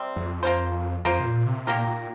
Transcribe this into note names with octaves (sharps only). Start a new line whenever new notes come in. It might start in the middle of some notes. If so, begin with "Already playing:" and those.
Already playing: C3 G3 C4
F2
A#3 F4 C5
F2 A#3 F4 C5
C3
A#2
C3
A#2 D#3 A#3 G4 A#4
A#2